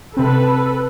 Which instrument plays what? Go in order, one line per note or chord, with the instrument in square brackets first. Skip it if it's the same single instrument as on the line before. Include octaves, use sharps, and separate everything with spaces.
[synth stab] C3 C4 [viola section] A4 B4